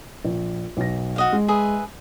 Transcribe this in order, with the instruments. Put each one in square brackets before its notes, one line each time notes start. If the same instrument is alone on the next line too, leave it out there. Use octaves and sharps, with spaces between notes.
[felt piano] A#1
B1 A#6
[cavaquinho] F#4 D#5 F5
[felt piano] G#3
[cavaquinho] G#4 B4 E5